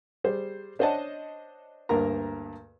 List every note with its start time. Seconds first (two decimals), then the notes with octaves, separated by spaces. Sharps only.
0.24 G3 G#4 C5
0.79 D4 C5 C#5 D#5 F#5 A5
1.89 D2 G2 A#3 A#4 A#5